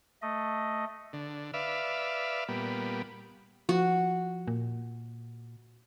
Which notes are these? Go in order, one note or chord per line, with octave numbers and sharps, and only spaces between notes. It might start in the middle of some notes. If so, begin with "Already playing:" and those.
A3 D#5
D3
B4 D5 E5 F5
A#2 G3 B3
F3 F#4
A#2